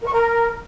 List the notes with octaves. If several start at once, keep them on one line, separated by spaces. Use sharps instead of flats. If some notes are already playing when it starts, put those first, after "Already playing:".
A#4
C#6
A#4